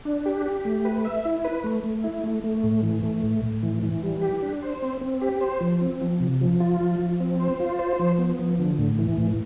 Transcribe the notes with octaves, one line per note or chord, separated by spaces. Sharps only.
D4
G4
G4
A3
B4
E5
E4
B4
A3
A3
E4
A3
A3
A2
E3
A3
A2
A2
E3
E3
G3
G4
D4
C5
C4
C4
G4
C5
F3
C4
F3
C3
F3
F4
F3
F3
C4
C5
F4
C5
F3
B3
F3
D3
A2
E3
A2